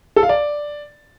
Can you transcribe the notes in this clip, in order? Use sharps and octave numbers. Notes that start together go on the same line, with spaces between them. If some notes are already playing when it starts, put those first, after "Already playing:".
A4
F5
D5